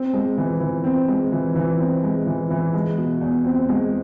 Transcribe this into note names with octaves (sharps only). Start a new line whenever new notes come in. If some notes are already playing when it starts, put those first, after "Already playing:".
Already playing: C4
G#3
E3
E3
C4
G#3
E3
E3
C4
G#3
E3
E3
G#3
B2
E2
C4
G#3